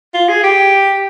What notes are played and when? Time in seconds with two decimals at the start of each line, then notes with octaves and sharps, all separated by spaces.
0.14 F4
0.29 G#4
0.43 G4